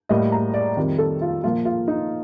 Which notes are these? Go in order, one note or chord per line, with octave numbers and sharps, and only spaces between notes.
A2 G3 A#3 D#5
A#5
D5
F2 D#3 G3
A4
F4
A#2 F3 A#3 F4
F4
D#4